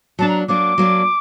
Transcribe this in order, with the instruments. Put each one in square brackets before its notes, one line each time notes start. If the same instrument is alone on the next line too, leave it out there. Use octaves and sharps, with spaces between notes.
[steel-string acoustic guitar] F#3 A#3 D4 [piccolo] A5
[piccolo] A#5
[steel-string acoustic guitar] F#3 A#3 D4 [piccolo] D6
[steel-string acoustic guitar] F#3 A#3 D4